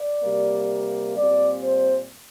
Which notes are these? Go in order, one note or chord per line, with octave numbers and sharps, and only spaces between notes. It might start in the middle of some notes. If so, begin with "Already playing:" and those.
Already playing: D5
C3 G3 A#3
A#2 G3 C4 D5
C5